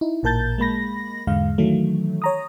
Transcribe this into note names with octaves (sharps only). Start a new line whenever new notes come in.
D#4 E4
A1 A#2 A#4 A5 G6 A6
G#3 A#3 B5 A#6
E2 G#2 D3 G#3 F5
D#3 E3 F#3 A3
C#5 A#5 D#6